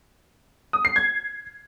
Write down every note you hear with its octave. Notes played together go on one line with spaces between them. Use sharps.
D#6
C7
G#6